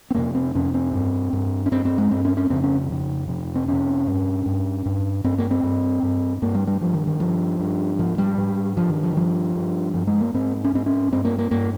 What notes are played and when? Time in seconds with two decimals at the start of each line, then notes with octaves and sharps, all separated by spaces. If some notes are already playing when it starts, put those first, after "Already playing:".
0.11 C4
0.15 F2 C3 A#3
0.35 C4
0.55 F2 C3 C#4
0.74 C4
0.93 G2
1.33 G2
1.66 C#4
1.72 G2 C4
1.85 C4
1.98 G#3
2.11 G2 C4
2.25 C#4
2.37 C#4
2.50 F2 C#3 C4
2.64 C#4
2.90 F2 C#3
3.28 F2 C3
3.56 C4
3.68 F2 C3 C#4
4.07 G2
4.46 G2
4.86 G2
5.24 G2 C4
5.38 A#3
5.51 C4
5.63 G2
6.03 G2
6.42 G2 A#3
6.55 G3
6.67 G3
6.81 G2 F3
6.94 D#3
7.07 D#3
7.20 G2 F3
7.60 G2
7.99 G#2 F3
8.18 G3
8.38 G#2
8.77 G2 F3
8.89 D#3
9.03 F3
9.11 D#3
9.16 G2 F3
9.56 G2
9.94 G2 F3
10.07 G#3
10.21 A#3
10.34 G#2 C4
10.64 C#4
10.73 G#2 C4
10.86 C#4
11.12 G2 C4
11.25 A#3
11.39 A#3
11.51 G2 A#3